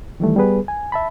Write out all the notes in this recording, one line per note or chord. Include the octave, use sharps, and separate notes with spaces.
D#3 E3 G3 A3
G3 B3 G#4 B4
G#5
E5 A5 B5